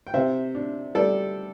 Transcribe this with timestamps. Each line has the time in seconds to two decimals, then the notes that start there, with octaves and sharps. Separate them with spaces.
0.07 G5
0.14 C3 C5 E5
0.55 D4
0.95 G3 A4 D5